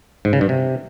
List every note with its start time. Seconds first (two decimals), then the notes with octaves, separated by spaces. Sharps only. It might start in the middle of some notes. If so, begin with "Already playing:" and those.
0.25 G#2
0.33 C#3
0.41 G2
0.49 C3